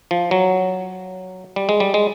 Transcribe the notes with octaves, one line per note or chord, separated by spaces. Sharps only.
F3
F#3
G3
G#3
G3
G#3